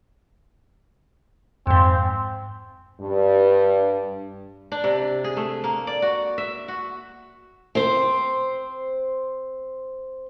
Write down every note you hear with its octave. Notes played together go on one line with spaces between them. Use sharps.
F2 G#2 C4
G2
D4
C3
G#4
A3
A#3
D5
F#4
E5
F#4
C4 C5